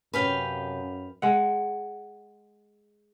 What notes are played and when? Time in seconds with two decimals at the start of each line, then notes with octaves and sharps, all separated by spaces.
0.14 F#2 C3 C#4 B4 F5 G5
1.22 G#3 F#5